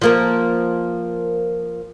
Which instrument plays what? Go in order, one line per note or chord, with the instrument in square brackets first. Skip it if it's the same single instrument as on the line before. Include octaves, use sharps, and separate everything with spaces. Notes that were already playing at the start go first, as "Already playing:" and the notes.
[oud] F3 A#3 A#4